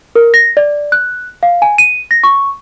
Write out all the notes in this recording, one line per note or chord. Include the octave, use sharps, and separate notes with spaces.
A#4
A#6
D5
F#6
F5
G#5
D#7
A#6
C#6